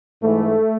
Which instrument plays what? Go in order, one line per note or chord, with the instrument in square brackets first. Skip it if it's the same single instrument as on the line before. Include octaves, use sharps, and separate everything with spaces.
[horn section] G#2 E3 A3